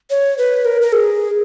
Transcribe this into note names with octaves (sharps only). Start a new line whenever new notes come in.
C#5
B4
A#4
A#4
G#4